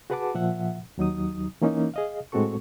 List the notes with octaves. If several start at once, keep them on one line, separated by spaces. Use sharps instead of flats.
F#4 G#4 B4 F#5 A5 D6
A#2 F3 E5 F#5
D#2 F#3 D#4 D#6
E3 A#3 C#4 D#4
G#4 D#5 F5
A2 G#3 C4 F#4 A4 C#6